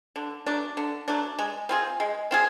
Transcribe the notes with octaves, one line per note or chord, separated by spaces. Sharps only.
D3
F#3 A3 D4
D3
F#3 A3 D4
G#3
C4 F4 G#4
G#3
C4 F4 G#4